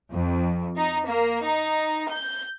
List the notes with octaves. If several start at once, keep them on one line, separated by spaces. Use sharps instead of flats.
F2
D#4
A#3
D#4
G6